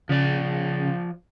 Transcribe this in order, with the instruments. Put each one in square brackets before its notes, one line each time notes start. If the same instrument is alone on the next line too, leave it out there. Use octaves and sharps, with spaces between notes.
[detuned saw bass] C#3 [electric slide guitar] F3 D5